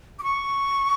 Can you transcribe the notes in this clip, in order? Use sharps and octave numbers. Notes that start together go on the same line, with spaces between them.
D6
C#6